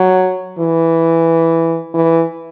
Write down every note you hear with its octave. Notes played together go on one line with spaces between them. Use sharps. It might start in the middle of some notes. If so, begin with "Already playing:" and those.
Already playing: F#3
E3
E3